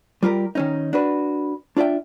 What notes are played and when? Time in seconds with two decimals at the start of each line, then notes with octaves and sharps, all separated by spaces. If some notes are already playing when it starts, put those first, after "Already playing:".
0.23 G3 F4 G4 A#4
0.55 D#3 C#4 D#4
0.93 D4 F#4 B4
1.77 D4 F4 D5 E5 G5